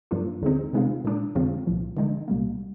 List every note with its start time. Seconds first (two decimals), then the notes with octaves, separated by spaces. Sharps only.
0.11 G2 F3 A#3 D4 F4
0.42 D#2 D3 G#3 C4 D#4
0.73 C3 D#3 G#3 C4 F4
1.04 A#2 G#3 D4
1.35 F2 D3 G#3 C4 F4
1.67 C2 A#2 F3
1.97 D3 G#3 D#4
2.28 C2 A#2 G3 A#3